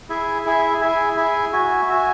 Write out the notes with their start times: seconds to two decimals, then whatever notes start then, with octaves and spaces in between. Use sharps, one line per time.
0.09 E4 G#4 E5 G#5
0.45 E4 G#4 E5 G#5
0.81 E4 G#4 E5 G#5
1.16 E4 G#4 E5 G#5
1.53 F#4 E5 G#5
1.88 F#4 E5 G#5